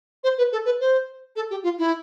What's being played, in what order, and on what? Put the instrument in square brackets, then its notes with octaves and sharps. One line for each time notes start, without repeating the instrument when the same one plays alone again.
[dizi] C5
B4
A4
B4
C5
A4
G4
F4
E4